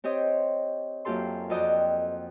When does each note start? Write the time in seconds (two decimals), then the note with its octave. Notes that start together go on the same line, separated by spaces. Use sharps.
0.04 C4 G4 C5 C#5 D#5
1.05 F#2 A#3 F4 G4 A4 C6
1.50 F2 F#4 D5 D#5 G5